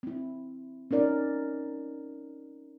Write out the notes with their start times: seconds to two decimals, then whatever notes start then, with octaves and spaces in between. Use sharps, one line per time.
0.03 C4 E4
0.91 C#4 D#4 A#4 D5